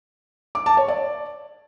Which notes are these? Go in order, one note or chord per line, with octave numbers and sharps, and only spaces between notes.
D6
A5
C#5
D5